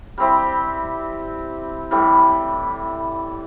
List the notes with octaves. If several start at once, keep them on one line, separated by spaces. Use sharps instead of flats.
G3 C4 E4 G4
A2 E3 G3